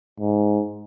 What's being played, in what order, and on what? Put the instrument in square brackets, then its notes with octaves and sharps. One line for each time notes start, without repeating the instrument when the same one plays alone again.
[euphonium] G#2